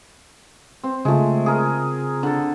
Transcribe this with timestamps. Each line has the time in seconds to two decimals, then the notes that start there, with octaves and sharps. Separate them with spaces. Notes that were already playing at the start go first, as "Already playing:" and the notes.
0.84 C4
1.05 C#3 G#3 A3 F4
1.46 G#4 A#4
2.23 D3 A4